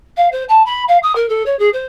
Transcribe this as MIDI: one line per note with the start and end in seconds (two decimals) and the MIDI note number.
0.16 0.28 77
0.32 0.43 72
0.48 0.62 81
0.65 0.83 83
0.88 0.97 77
1.02 1.13 87
1.15 1.26 70
1.29 1.42 69
1.46 1.57 73
1.59 1.69 68
1.73 1.86 72